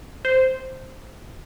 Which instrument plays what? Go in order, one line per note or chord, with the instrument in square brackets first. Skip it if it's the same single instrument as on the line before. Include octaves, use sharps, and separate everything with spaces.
[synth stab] C5